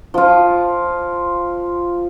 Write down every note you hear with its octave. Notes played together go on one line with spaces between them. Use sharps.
F3 F4